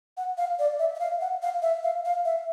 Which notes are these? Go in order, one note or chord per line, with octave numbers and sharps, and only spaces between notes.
F#5
F5
D5
E5
E5
F5
F#5
F5
E5
F5
F5
E5